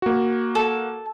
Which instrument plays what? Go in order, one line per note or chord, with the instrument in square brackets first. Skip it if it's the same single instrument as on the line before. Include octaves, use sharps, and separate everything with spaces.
[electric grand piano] A#3 F#4
[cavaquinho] A4